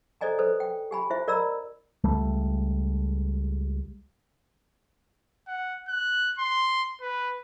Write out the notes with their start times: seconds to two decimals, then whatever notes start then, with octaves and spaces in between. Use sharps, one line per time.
0.21 A4 C5 D5 D#5 G#5 A#5
0.39 A4 B4 C5
0.60 G5
0.91 G4 G#5 B5
1.10 E4 C5 E5
1.28 A#4 D5 D#5 A#5 B5 E6
2.04 C#2 G3 A3
5.47 F#5
5.88 F#6
6.38 C6
7.01 B4